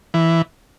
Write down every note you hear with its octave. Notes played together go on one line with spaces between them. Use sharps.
E3